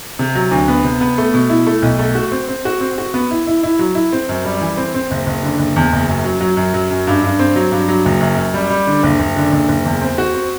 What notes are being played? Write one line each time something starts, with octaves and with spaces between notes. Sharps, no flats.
C3
F#3
D2
B3
C3
B3
A3
B2
E4
A3
B1
A3
F#4
C4
C4
F#4
C4
F#4
B3
E4
E4
E4
F#3
E4
C4
F#2
G3
E3
C4
C4
F#1
F#1
D3
F#1
E2
F#1
F#2
F#3
F#3
F#2
F#3
F#2
G2
G2
C4
F#3
G2
F#3
F#1
F#2
F#2
G3
G3
D3
F#1
F#1
D3
F#1
F#1
E2
C4
F#4
C4